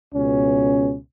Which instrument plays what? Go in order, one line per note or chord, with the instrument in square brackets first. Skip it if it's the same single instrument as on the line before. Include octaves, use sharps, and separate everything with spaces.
[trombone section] C#2 B2 C#4